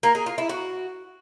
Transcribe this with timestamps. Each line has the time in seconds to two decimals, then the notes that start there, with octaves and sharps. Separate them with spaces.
0.03 A#3
0.15 G#4
0.26 F4
0.38 E4
0.49 F#4